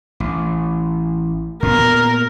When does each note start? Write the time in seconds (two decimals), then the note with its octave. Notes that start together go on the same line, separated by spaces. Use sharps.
0.20 A1
1.63 A#2 B3 A#4